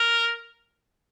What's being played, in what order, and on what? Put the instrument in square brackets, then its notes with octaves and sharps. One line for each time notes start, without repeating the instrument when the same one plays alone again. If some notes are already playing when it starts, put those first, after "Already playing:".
Already playing: [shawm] A#4